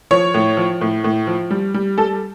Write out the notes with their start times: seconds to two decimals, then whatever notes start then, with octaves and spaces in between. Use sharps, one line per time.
0.11 F3 C#5
0.34 A2
0.57 F3
0.81 A2
1.04 A2
1.27 F3
1.51 G3
1.74 G3
1.98 G3 A4